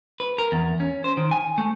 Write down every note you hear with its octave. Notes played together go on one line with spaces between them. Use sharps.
B4
A#4
E2
C#4
C5
D#3
G#5
A3